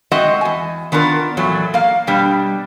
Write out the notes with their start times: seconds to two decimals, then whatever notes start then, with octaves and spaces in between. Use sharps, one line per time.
0.12 G#3 C4 F#4 D#5 E5 F#5
0.41 E2 G#5
0.92 D#3 B3 D4 F4 A#4
1.37 E2 A#2 F#3 A3
1.74 A#3 F5
2.07 B2 G3 D4